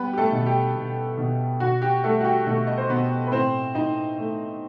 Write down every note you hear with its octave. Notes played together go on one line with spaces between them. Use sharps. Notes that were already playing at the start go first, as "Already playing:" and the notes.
Already playing: G3 B3 B4
G4
A3 A4
B2
G4
B2
B2
B2 F#4
G4
G3 A3 A4
F#4
G4
B2 A3 A4
D#5
C5
B2 B3 B4
B4
A2 C4 C5
A2 D#4 D#5
A3